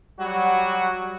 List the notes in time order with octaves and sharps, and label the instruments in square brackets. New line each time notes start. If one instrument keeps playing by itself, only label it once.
[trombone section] F#3 G3 F#4